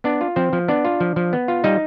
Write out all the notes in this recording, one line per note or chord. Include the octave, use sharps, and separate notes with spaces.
B3 D4 D5
F4
F3 C4 C5
F3
B3 D4 D5
F4
F3
F3
B3
F4
G3 D#4 D#5